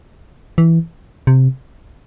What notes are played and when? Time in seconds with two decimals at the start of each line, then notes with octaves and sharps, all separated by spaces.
0.58 E3
1.27 C3